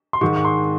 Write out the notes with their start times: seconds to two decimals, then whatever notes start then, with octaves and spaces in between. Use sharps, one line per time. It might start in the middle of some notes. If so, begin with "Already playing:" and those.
0.13 C6
0.21 G#2 D#3 G#3 C#6
0.36 C#6
0.45 C6